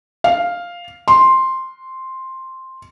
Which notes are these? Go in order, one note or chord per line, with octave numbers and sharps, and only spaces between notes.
F5
C6